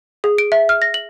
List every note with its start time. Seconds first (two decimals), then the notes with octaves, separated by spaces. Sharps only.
0.24 G#4
0.38 D7
0.52 E5
0.69 F6
0.82 A#6
0.94 F#7